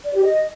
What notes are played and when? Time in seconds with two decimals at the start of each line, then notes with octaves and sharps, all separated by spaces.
0.05 D5
0.14 G4
0.23 D#5